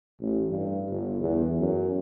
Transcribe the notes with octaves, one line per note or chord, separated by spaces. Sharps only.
A1
G2
G1
E2
F#2